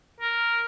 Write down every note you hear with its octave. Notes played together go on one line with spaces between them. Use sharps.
A#4